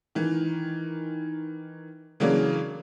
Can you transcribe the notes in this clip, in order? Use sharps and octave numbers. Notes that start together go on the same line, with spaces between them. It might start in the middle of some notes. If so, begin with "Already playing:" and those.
D#3 E3
C#3 E3 F#3 G#3 A#3 D4